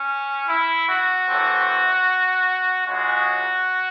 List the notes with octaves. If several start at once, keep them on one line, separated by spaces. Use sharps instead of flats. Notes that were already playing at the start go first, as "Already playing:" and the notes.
Already playing: C#4
E4
F#4
A2 E3 A3 C4
C#2 C#3 G#3 F#4